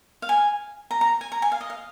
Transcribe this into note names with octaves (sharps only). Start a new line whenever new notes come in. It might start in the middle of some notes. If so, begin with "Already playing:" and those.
F5
G#5
A#5
A#5
G#5
A#5
G#5
F5
D#5
F5